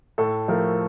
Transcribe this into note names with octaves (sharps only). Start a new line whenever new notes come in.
A2 A4
F3 A3 A#4